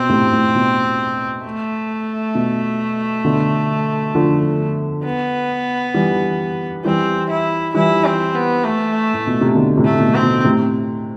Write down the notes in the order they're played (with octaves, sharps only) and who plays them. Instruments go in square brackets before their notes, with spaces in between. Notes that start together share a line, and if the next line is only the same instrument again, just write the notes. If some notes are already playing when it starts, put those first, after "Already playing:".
Already playing: [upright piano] B2 [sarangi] C4
[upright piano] A2 C3
A2
B2
[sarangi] A3
[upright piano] B2
B2 D3
D3 F3
[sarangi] B3
[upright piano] E3 G3
[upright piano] E3 G3 [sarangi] C4
[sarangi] E4
[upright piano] E3 G3 [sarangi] E4
[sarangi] C4
B3
A3
[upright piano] A2
B2
C3
B2 D3
A2 C3
[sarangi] A3
[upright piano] B2
[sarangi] C4
[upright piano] B2
A2 C3